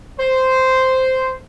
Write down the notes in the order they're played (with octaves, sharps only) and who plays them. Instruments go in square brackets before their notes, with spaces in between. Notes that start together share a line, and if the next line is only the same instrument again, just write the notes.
[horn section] C5